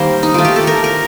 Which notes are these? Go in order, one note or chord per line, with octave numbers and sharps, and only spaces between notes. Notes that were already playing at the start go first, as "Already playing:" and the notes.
Already playing: D#3 G3 A#3 A#4 C5
D#4
D#3 A3 F4
G4
A4
A#4
A#4